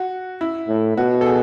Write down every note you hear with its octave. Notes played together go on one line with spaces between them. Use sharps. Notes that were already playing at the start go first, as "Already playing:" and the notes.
Already playing: F#4
E4
A2
B2 F#4
A4
G#4